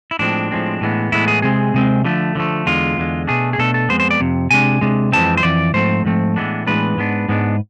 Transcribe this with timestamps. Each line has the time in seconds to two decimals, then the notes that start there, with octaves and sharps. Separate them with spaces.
0.11 E4
0.19 A2 F3 G#3 C4 D4
0.51 A2 F3 G#3 C4
0.81 A2 E3 G#3 B3
1.12 A2 E3 G#3 B3 E4
1.28 G#4
1.42 C3 G#3 C4 G#4
1.74 C3 G#3 C4
2.05 D3 F3 A3
2.35 D3 F3 A3
2.66 E2 D3 G#3 F4
2.97 E2 D3 G#3
3.27 B2 A3 D4 G#4
3.53 G#4
3.58 B2 A3 D4 A4
3.74 A4
3.89 F2 C3 G#3 B3 C5
4.00 C5
4.11 D5
4.20 F2 C3
4.51 C3 G#3 D4 G#5
4.81 C3 G#3 D4
5.12 F2 E3 G#3 C4 A5
5.37 C5
5.43 F2 E3 D5
5.74 G#2 F3 A3 C4 C5
6.05 G#2 F3 A3 C4
6.36 A2 E3 G#3 B3 D4
6.67 A2 E3 G#3 B3 D4 B4
6.97 G#2 G#3 B3 D4
7.29 G#2 G#3 B3 D4